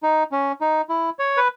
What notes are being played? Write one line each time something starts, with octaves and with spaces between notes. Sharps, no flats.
D#4
C#4
D#4
E4
C#5
B4